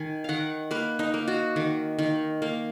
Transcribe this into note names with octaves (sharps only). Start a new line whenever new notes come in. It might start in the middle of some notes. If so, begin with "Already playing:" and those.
Already playing: D#3 G#5
D#3 F5 F#5
A#3 B4
D#4
A#3
F#4
D#3
D#3
A#3